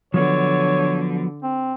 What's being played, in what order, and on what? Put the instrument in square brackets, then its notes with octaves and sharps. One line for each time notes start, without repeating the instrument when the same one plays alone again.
[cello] D3 [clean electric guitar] F3 F#3 B3 [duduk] C#5
[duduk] C4